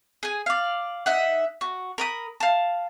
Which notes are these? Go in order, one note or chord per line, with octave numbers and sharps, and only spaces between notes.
G#4 G#5
D5 F5
D#4 E5 F#5
F#4
A#4 B5 D#6
F5 A5